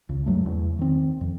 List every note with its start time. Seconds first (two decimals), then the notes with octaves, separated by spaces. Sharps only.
0.09 C#2 C#3
0.26 F#2 F#3 G#3 A3
0.46 E2
0.79 D#3 C4
1.21 F2